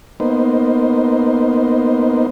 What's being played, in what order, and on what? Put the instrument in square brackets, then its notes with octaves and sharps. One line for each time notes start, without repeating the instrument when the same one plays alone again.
[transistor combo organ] A#3 B3 D#4 C5